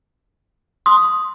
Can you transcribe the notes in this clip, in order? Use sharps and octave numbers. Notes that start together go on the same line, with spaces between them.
C6 D#6